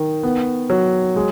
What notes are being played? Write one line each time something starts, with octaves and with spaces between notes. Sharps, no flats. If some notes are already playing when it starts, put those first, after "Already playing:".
Already playing: D#3
B3
F#3
G#3